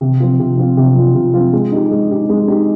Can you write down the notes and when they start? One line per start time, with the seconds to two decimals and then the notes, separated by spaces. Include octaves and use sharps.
0.01 C3
0.20 F3 C4 F4
0.40 C3
0.57 F3 C4 F4
0.77 C3
0.96 F3 C4 F4
1.15 C3
1.34 F3 C4 F4
1.53 G#3
1.72 D#4 G4
1.91 G#3
2.10 D#4 G4
2.29 G#3
2.48 D#4 G4